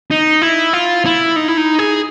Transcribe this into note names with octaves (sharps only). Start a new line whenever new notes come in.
D#4
E4
F4
E4
D#4
E4
D#4
G#4